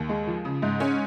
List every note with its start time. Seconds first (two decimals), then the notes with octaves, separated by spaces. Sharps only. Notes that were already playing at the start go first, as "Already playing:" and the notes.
Already playing: D#2
0.09 G#3
0.27 F3
0.45 C#3
0.62 G#2
0.80 C#4